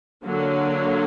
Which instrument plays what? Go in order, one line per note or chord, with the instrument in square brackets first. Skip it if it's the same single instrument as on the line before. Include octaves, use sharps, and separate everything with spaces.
[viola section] D3 F#3 A#3